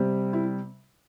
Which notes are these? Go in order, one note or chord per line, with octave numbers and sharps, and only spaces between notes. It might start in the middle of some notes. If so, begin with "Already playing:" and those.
Already playing: C3 G3
E4